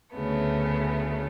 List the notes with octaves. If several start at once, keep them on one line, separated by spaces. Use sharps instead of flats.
D2 C#3 A3 B3